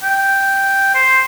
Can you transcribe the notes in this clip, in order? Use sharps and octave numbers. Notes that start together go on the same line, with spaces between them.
G5
C5